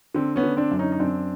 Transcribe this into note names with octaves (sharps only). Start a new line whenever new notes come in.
D3 C4
B3 C#4
D3
C4 D4
F#2
C#4 D#4
D#4
F#2 C4 D4